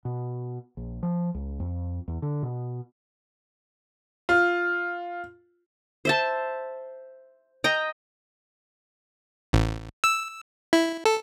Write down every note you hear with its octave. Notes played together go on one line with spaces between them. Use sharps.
B2
A#1
F3
C#2
F2
E2
D3
B2
F4
C5 E5 A5
D#5 G5 A#5
A1
E6
E4
A4